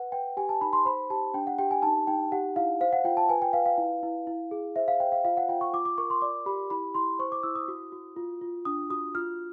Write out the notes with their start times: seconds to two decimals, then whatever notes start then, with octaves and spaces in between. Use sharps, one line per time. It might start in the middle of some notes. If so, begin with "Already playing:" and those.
Already playing: B4 F#5
0.12 B4 G5
0.37 G4 G#5
0.49 A5
0.61 D#4 B5
0.73 C6
0.85 C5 B5
1.10 G4 A5
1.34 D4 G5
1.47 F#5
1.58 G4 G5
1.71 G#5
1.83 D#4 A5
2.07 D#4 G5
2.32 G4 F#5
2.56 E4 F5
2.81 C5 F5
2.93 F#5
3.04 F4 G5
3.17 A5
3.29 B4 G#5
3.42 G5
3.53 B4 F5
3.66 F5
3.78 E4
4.03 E4
4.27 E4
4.51 G#4
4.76 C5 E5
4.88 F5
5.00 C5 G5
5.12 F5
5.24 F4 F5
5.37 F#5
5.48 F4 G5
5.61 C#6
5.73 F4 D6
5.85 D6
5.98 A#4 C#6
6.10 C6
6.21 D5 D6
6.46 G4 B5
6.70 E4 B5
6.95 E4 C6
7.19 C5 C#6
7.32 D6
7.43 E4 E6
7.55 D#6
7.68 F#4
7.92 F#4
8.16 F4
8.41 F4
8.65 D4 D#6
8.90 F#4 D#6
9.15 F4 F6